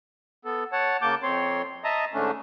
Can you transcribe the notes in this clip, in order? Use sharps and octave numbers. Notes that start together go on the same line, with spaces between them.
B3 A4
C#5 F#5 A5
C#3 A#3 A5 D6 G6
F2 C4 C#5 C6
D#5 E5 A5 A#5 D#6
G#2 D3 A3 C#4 D4